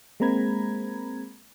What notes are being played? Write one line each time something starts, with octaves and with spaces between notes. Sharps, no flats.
G#3 A#3 C4 A#5 B5 G#6